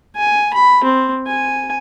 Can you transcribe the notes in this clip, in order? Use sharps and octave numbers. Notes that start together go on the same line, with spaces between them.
G#5
B5
C4
G#5